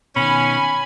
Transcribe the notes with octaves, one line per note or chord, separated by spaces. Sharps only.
B2 D#3 C#4 G#5 B5